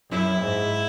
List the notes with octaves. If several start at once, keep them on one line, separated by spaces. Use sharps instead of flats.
F#2 E4
G#2